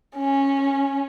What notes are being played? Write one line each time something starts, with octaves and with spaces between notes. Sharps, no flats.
C#4